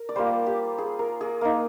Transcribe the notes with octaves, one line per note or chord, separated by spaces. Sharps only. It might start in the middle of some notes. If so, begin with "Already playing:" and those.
Already playing: A#4
D5
G3 A#3 F4 C5
G4
G#4
A#4
G#4
A#3 D#4